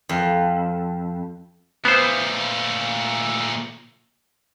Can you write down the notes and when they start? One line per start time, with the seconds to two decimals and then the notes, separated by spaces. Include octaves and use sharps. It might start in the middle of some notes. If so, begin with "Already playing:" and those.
0.09 F2
1.85 A#2 A3 B3 C5